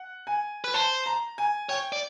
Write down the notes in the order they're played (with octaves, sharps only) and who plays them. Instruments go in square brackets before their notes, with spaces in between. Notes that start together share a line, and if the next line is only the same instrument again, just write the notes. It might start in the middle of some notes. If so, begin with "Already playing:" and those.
Already playing: [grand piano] F#5
G#5
[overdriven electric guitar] B4
[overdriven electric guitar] C5 [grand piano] A5
[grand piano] A#5
G#5
[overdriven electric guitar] C#5 [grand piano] G5
[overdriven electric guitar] D5